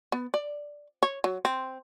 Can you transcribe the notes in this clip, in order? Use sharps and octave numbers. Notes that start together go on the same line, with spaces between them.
B3
D5
C#5
F#3
C4